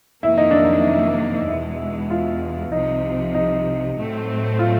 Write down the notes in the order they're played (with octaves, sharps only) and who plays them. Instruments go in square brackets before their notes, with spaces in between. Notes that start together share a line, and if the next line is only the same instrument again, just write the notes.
[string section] F2 C3 D#3 F#3 A#3 [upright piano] E4
[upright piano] D#4
D4
D#4
[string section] E2 B2 G#3 [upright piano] E4
[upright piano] F4
[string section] C2 C3 F3 [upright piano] D#4
[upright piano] D#4
[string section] A2 F#3 A3 C4
[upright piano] F4